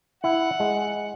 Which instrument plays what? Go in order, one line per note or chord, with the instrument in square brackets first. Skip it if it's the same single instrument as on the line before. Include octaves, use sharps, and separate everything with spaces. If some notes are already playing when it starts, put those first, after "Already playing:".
[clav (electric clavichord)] E4 [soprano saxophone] F#5
[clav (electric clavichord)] G#3